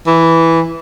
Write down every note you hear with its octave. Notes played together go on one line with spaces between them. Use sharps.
E3